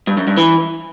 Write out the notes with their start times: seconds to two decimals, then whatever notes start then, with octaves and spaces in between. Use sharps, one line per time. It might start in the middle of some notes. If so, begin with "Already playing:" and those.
0.07 G2
0.17 F#2
0.27 G2
0.37 E3